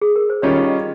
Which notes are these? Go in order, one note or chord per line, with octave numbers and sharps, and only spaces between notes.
G#4
A#4
C5
D#3 G3 C#4 F4 C#5
D#5
D#5